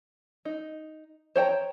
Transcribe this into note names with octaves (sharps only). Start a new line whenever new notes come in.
D#4
C5 C#5 G5 A#5